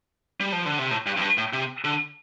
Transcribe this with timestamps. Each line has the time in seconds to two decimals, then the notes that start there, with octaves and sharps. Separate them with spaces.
0.40 G3
0.52 F3
0.66 D3
0.79 C3
0.91 A2
1.06 G2
1.17 F2
1.21 G2
1.38 A2
1.53 C3
1.84 D3